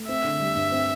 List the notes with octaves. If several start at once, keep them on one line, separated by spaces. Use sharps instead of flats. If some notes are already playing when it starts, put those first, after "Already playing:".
Already playing: A3
C4 E5
D3
G3
G2
C4